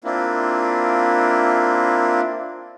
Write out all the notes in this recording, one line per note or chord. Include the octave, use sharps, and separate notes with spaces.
A#3 C4 D4 E4 F4